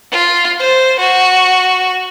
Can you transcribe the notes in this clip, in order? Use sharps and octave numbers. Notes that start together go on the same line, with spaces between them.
F4
C5
F#4